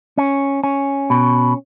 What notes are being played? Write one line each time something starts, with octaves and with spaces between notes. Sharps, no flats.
C#4
C#4
B2